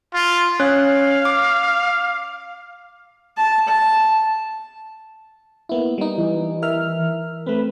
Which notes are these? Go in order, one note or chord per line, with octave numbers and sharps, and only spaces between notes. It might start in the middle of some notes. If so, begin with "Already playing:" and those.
F4
C#4 C#5 F5 F#6
D6
A5
A5
A#3 B3 E4
G3 D#4
E3
A#4 E5 F6
A3 C4 B4